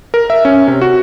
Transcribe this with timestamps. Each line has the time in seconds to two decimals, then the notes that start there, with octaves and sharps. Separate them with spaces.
0.14 A#4
0.30 E5
0.45 C#4
0.68 C3
0.81 F#4